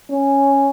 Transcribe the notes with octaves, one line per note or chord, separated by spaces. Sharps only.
C#4